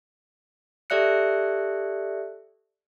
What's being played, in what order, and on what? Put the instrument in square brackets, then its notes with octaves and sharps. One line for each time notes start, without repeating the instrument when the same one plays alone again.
[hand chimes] G4 A4 D5 E5 F#6 C#7